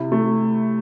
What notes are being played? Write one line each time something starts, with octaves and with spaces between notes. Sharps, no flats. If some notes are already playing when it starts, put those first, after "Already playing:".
Already playing: C3 E4
A3